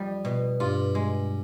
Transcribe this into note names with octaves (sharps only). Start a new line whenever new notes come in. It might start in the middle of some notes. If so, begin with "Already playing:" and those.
Already playing: F2 G3
B2
G2 F4
G#3